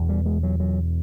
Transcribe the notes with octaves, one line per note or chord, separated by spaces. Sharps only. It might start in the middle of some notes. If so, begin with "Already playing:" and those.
Already playing: E2 B2
G3
G#3
F#3
F#3